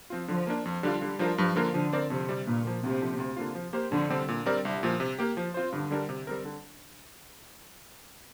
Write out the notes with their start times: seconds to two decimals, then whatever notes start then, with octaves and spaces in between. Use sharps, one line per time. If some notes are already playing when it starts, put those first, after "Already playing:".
0.10 F3 C4 F4
0.28 D3 F3
0.47 A#3 D4
0.65 F2
0.83 D3 G3 D4 F4
1.01 D3 G3
1.19 F3 D4 F4 A#4
1.38 G2 F3
1.56 D3 A#3 F4 A#4
1.74 D3 F3
1.93 C4 A#4 D5
2.10 F2 C3
2.29 C3 G3
2.46 G2 A#2
2.65 F3 A#3
2.83 D2 C3
3.01 D3 F3
3.19 D2
3.37 D3 A#3 F4
3.55 F3
3.73 A#3 G4 C5
3.92 F2 D3
4.09 C3 G3 C4
4.28 A#2
4.46 G3 C4 A#4 D5
4.64 C2 G3
4.83 A#2 F3
5.00 C3
5.19 A#3 G4
5.37 F3
5.54 C4 F4 C5
5.72 G2 D3
5.91 D3 G3 D4 A#4
6.09 C3
6.27 G3 C4 A#4
6.45 D3